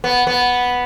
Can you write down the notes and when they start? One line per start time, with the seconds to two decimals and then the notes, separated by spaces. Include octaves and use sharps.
0.04 B3
0.27 B3